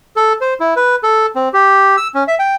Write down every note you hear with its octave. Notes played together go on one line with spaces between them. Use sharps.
A4
C5
E4
B4
A4
C4
G4
E6
C#4
E5
G5